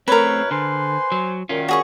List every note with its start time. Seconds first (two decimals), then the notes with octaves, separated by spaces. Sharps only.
0.08 F#2 A3 C4 A#4 B4 C#5
0.51 D3 C5 G#5 C6
1.12 F#3
1.49 F#2 A#2 D#3 C#4 F4
1.68 F#4 G#4 C#6